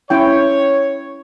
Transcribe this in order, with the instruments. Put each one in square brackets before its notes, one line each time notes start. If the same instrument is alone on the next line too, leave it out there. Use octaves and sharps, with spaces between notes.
[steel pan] C#4 E4 G5 [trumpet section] C#5